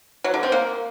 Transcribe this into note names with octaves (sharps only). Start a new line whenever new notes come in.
F#3
D3
C4
A#3